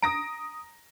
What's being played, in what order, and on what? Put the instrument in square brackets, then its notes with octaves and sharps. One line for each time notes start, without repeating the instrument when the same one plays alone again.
[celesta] A#5 [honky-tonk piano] D#6 A#6 D7